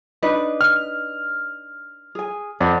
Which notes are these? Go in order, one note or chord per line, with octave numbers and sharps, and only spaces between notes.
D4 D#4 B4
F6
G#4 G#5
F2 D5 F#5